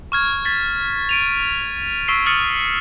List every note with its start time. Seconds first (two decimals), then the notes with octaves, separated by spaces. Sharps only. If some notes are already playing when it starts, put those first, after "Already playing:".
0.12 C#6 F6 G#6
0.45 G#6 A6 B6
1.09 D7 D#7 F7
2.08 C#6 E6 B6 C7 D7
2.26 D#6 F6 A6 C#7 D#7